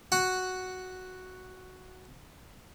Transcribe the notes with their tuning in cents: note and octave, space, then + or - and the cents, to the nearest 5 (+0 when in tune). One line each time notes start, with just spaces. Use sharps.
F#4 +0 F#5 +0